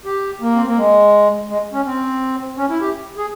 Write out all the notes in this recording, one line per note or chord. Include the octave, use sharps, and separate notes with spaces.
G4
A#3
C4
A#3
G#3
G#3
C#4
C4
C#4
E4
G4
G#4